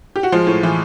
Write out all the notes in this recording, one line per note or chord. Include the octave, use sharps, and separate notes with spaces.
G4
F#4
F3 G#3 F4
A2
E3